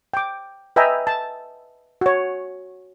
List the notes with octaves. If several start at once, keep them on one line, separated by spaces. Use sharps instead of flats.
G5 D6
B4 D#5 E5 G5 G#5 A#5
A5
F#4 C#5